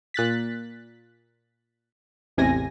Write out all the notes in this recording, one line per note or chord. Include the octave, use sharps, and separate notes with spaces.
A#2 F#6 A6 B6
A1 E2 C3 G#5 A#6